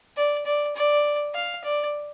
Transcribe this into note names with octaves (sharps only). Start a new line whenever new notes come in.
D5
D5
D5
F5
D5